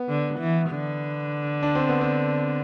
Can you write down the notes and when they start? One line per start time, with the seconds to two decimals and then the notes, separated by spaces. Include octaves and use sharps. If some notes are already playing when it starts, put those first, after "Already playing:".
Already playing: B3
0.09 D3
0.40 E3
0.71 D3
1.63 D4
1.75 C4
1.89 B3
2.01 C4